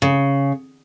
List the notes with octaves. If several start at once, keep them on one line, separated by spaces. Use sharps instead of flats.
C#3